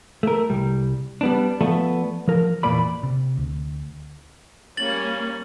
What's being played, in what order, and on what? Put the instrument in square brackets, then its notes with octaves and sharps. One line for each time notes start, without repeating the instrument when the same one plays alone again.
[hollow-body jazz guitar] A3 A#4
C2 G3
G3 B3 D4
F3 A3 B3 A4 D5 E5
F3 A#4
E2 A#2 A#3 D5 B5
[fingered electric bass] C3
D2
[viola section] G3 A#3 C#4 [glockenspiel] A6 F#7